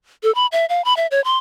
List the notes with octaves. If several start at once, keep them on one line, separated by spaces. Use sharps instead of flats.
A4
B5
E5
F5
B5
E5
C#5
C6